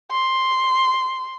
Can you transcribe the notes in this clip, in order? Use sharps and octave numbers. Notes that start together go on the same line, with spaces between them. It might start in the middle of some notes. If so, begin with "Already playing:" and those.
C6